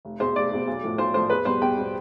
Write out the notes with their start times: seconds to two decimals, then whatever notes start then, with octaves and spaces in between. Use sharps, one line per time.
0.05 F1
0.20 E2 B2 C5
0.36 F1 D5
0.51 E2 B2
0.67 B1
0.83 A2 F3
0.98 B1 C5
1.14 A2 F3 C5
1.30 E2 B4
1.45 B2 G3 C5
1.61 E2 G5
1.77 B2 G3